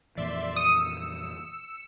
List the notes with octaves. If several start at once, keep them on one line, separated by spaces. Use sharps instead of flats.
F2 A#2 E3 D5 E5 C6
D#6 E6 C#7